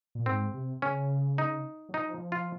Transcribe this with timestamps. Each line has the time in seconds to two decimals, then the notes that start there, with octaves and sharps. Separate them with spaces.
0.15 A#2
0.26 G#2 C4
0.54 C3
0.82 C#3 C#4
1.38 D#4
1.89 F#3
1.94 F3 D#4
2.32 F4